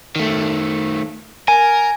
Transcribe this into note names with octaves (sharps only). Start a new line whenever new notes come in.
D#3 A3
A#4 G#5